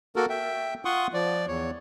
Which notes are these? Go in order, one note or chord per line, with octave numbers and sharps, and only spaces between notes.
A#3 F#4 A4 A#4
E5 G5
F4 F#5 C6 C#6 D#6
F3 D5
E2 C#5